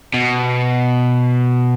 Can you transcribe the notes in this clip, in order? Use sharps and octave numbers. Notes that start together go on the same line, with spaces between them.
B2